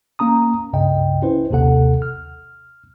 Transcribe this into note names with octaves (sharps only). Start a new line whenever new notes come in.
A#3 C#4 A#5 D#6
C#2 G2 C#3 D#5 G5
C#4 E4 B4 C5
A#1 D#2 C3 A4 F#5
F6